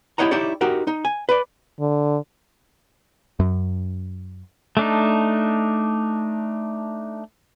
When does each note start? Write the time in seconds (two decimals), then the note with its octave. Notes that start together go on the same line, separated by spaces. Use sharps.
0.18 E4 G4 C#5 D#5 F#5 A#5
0.31 D#4 E4 G4 C#5 D5
0.61 D#4 F#4 G4 A#4
0.87 D#4
1.05 G#5
1.29 B4 D5
1.80 D3
3.40 F#2
4.77 A3 D4 D#4